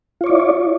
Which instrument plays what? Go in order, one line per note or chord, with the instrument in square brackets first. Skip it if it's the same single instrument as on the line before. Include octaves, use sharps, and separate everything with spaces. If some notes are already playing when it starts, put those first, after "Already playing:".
[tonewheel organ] F4
C#5
D5
E4